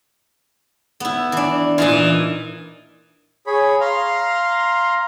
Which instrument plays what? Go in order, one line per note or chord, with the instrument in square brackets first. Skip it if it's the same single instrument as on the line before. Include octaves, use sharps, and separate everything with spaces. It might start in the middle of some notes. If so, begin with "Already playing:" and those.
[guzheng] B3 E4
E3 D4
[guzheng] A#2 D#4 F4 [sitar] E3
[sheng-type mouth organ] G#4 C#5 B5
F5 A#5 C6